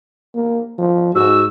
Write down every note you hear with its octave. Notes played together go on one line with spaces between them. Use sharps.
A#3
F3
G#2 F#4 E6